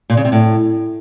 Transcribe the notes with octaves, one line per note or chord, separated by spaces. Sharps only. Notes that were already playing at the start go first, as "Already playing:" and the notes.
A#2
C#3
C3
A2